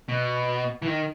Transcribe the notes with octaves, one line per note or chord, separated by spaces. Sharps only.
B2
E3
D#3